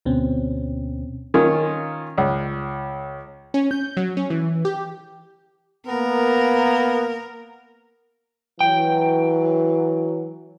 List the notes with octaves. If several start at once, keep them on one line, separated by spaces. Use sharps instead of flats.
D2 B2 C4 C#4
D#3 A#3 C#4 F4
C#2
C#4
G6
F#3
C#4
E3
G4
A#3 B3 A#4
E3 F#3 G5